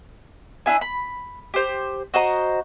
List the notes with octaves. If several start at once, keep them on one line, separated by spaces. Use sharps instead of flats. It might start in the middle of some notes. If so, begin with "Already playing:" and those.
D4 E4 G#5
B5
G4 C5
F#4 C5 D#5 A#5